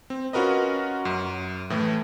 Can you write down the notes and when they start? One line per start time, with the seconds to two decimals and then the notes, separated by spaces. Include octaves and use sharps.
0.10 C4
0.33 C#4 F4 F#4 A#4 B4 D#5
1.05 F#2
1.70 A2 E3 A3